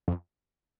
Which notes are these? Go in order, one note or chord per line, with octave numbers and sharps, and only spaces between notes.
F2